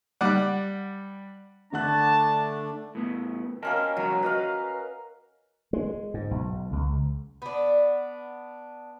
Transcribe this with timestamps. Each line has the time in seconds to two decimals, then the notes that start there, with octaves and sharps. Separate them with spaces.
0.21 G3 D5 F#5
1.72 D3 A3 D4 F#5 A5 F#6
2.95 A2 B3
3.63 A#3 C#4 A#4 D#5 G5 A5
3.97 C2 F3 F#3 A#5
4.23 F#4 B4 D#5 F5
5.73 G#3
6.14 G#2
6.31 B1
6.73 C#2
7.42 B3 D4